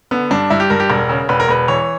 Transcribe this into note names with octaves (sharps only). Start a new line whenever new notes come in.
D3 B3
G2 D4
G2 E4
G4
G2 A#4
G4
E1 A#4
C#3
E1 B4
A#4
E1 B4
E3 C#5